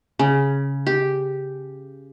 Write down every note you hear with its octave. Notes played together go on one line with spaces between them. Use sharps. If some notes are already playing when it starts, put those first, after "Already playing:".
C#3
G4